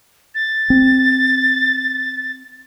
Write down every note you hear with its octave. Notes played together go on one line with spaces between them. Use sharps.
A6
C4